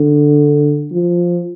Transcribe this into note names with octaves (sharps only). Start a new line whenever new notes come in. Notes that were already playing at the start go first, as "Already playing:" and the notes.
Already playing: D3
F3